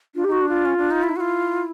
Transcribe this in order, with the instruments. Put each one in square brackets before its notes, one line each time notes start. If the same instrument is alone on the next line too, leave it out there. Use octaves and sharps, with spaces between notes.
[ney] D4 [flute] F4
[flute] G4
[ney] D#4 [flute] F#4
[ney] D4
[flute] F4
[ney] C#4
D4
D#4
E4
[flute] D#4
[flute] E4 [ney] F#4
[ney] F4